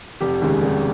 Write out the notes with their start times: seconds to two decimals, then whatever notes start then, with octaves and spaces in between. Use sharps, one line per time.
0.20 F1 G4
0.42 D#2 C#3 G#3
0.62 F1